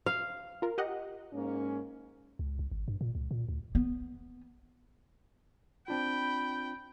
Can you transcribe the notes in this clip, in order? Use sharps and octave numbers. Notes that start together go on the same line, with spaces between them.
F5
F4 A#4
G4 D#5 F#5
G#2 A#3 C#4
C#2
C2
G#1
G2
A#2
C#2
A#2
D2
B3
C4 D4 F4 G5 B5